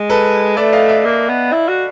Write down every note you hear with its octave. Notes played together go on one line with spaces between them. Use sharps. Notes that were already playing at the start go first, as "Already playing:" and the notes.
Already playing: G#3
A4 B4
A3 D5 E5
D#5 F5
D5 E5
A#3
B3
E4
F#4